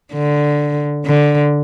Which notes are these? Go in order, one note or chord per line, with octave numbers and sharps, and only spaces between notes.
D3
D3